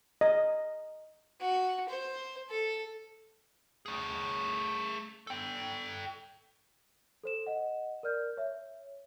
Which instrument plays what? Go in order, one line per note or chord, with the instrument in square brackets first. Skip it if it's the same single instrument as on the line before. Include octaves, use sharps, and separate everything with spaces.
[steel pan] D#5
[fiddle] F#4
C5
A4
[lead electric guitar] A3 G#4
A4 G5
[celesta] A4 C5 E7
D#5 F#5
A#4 D5 F6 G6
C#5 E5